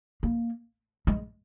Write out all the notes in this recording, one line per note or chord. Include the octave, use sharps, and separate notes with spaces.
A#3
G#3